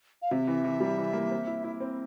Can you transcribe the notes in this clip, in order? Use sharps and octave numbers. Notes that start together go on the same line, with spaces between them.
F5
C3 E5
E3
E3
G3
E3
A#3
C4
E4
E4
C4